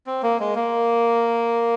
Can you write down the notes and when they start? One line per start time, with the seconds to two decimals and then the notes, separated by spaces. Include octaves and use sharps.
0.07 C4
0.23 A#3
0.40 G#3
0.55 A#3